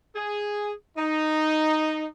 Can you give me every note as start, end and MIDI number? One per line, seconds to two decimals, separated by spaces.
0.16 0.72 68
0.97 2.06 63